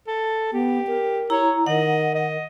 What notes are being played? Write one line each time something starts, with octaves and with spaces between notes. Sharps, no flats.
A4
B3 G4
A#4
E4 C#5 A#5
D#3 D#5 F#5
D#5